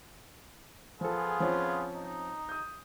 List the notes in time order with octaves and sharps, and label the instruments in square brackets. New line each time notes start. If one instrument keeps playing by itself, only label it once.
[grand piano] F3 A4 [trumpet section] B3 F4 G#4
[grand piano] F3 C4 C#4
[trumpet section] D#4
[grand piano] D#6 G6